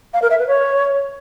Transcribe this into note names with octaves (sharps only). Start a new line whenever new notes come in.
F5
A#4
E5
B4
C#5